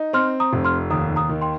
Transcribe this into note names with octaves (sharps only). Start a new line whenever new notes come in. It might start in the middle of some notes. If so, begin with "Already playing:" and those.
Already playing: D#4
C4 C6 F6
A#5 D#6
F1
C6 F6
D#2 A#5 D#6
A#5 D#6
D#3
G5 C6